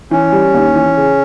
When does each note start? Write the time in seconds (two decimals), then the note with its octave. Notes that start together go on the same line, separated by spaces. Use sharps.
0.11 E3 C#4
0.32 G3
0.54 D#2
0.75 E3
0.97 C#3